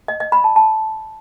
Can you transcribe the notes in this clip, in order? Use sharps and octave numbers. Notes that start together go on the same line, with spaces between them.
D#5
D#5
B5
A5
A5